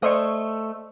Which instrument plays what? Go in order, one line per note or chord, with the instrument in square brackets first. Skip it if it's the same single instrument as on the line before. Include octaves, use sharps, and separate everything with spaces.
[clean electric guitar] A3 [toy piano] C5 D5 [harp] D#5 C6 C#6